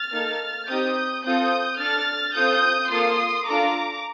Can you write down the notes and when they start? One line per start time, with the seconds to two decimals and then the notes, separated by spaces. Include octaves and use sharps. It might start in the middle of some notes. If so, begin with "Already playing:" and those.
Already playing: F6 A6
0.12 A#3 D#4 A4
0.68 C4 D#4 G4 D#6 G6
1.24 C4 F4 A4 D#6 G6
1.80 D4 A4 F6 A6
2.35 C4 F4 A4 D#6 G6
2.91 A#3 F4 A4 C6 D#6
3.47 D4 F4 A4 A#5 D6